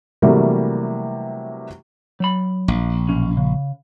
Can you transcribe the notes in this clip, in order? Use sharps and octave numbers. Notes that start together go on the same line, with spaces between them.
C3 E3 F#3 G3 A3 A#3
F#3 B5
A#1
B1 C#4
C#3